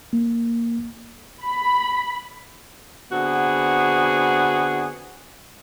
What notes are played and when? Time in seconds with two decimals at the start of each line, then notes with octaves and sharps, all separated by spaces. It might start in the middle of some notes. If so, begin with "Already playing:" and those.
0.13 A#3
1.43 B5
3.12 D3 B3 C4 F#4 G#4